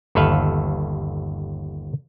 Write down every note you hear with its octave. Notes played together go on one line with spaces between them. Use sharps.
G1 D#2 A4 B4 E5 F5